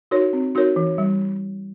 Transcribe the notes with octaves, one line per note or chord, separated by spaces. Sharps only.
D#4 F#4 A#4 C#5
C4
D#4 F#4 A#4 C#5
E3
G3